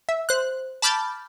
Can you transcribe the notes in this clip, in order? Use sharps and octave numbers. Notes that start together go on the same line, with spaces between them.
E5
C5 F#6
A5 B5 D6 F6 G6 A6